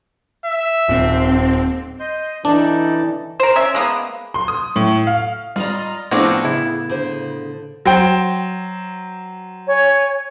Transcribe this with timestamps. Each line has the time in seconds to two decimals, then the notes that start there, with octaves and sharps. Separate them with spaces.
0.46 E5
0.88 D#1 C4
2.00 D#5 C6 G6
2.45 E3 D4 D#4 A4 D5
3.40 A#4 C5
3.56 C#4 E5
3.75 G#3 A#3 B3
4.34 C6
4.48 D#6
4.76 A2
5.07 F5
5.56 G3 F4 D5 D#5 A#5
6.11 A2 F3 B3 C4 D4 G#4 C#5 A#6
6.45 C#3 E4
6.89 D3 C5
7.85 F#3 C5 G5
9.67 C#5 G#5